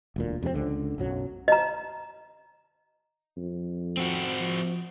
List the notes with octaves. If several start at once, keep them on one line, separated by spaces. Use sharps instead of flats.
E1 D2 A#2
F2 C3 F#3 C4
C#2 D3
B1 F#2 F#3
D#5 A#5
F2
C4 F#4
F3